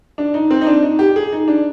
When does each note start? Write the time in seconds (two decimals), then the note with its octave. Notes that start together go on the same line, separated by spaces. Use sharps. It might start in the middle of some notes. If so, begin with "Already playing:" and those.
0.18 D4
0.34 D#4
0.50 C4
0.61 D#4
0.67 D4
0.83 D#4
0.99 G4
1.16 G#4
1.32 D#4
1.48 D4